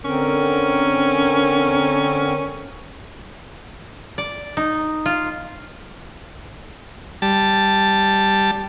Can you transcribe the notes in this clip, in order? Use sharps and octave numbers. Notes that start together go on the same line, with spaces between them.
D3 C4 C#4 A#4
D5
D#4
F4
G3 A5